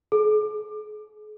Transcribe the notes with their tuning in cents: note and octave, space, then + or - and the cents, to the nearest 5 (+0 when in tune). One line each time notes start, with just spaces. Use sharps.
G#4 +40